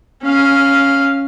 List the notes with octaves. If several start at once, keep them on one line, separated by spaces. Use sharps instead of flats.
C#4 F5